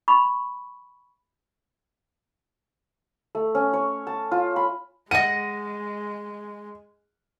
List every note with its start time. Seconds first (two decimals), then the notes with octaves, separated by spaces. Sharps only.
0.08 B5 C#6
3.35 A3
3.55 C#4
3.73 C#5
4.07 A5
4.31 F4
4.56 B5
5.11 G#3 D#5 F#5 D#7